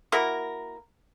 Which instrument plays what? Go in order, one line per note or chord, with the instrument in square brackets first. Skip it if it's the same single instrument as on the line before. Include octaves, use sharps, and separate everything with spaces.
[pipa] A#3 E4 F#4 A#4